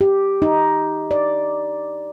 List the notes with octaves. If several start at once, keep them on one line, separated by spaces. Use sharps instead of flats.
G4
D#4
D5